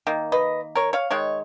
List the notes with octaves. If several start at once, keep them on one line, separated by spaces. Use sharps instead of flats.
D#3 A#3
B4 D#5
A#4 C#5
C#5 F5
D#3 G#3 C#5